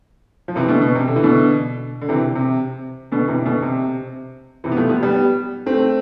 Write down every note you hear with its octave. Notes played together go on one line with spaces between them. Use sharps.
F3
C3 E3
B2 D3
B2
C3
D3
E3
B2 D3
D3
C3 E3
C3
B2 D3
C3 E3
B2 D3
C3
C3 E3
B3
F3 A3
G3 B3
G3 B3
A3 C4